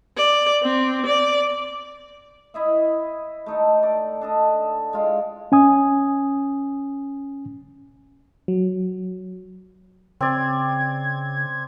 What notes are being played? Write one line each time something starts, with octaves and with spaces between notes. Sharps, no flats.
D5
C4
D5
E4 D#5 E5
A3 D#4 A4
D5
D4 A4 D#5
G#3 F4
C#4 G#5 D#6
F#3
C#3 C4 D5 G#6